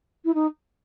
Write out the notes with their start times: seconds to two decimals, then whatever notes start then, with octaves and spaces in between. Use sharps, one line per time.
0.25 E4
0.34 D#4